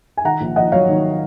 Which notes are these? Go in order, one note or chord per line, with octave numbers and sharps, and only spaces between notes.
G#5
D#3 F#5 A#5
A#1
A#1 D#5 F#5
F#3 C#5 F5
D#3